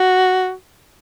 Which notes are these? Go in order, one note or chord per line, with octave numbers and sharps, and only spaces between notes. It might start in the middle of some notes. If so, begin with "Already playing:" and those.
Already playing: F#4